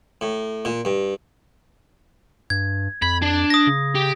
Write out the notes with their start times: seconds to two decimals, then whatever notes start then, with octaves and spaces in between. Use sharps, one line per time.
0.21 A2
0.65 A#2
0.85 G2
2.50 G2 G#6
3.02 F2 B5 G#6
3.22 D4
3.50 D#6 A#6
3.67 C#3
3.95 G4